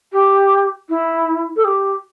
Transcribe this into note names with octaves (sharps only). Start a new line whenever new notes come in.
G4
E4
A4
G4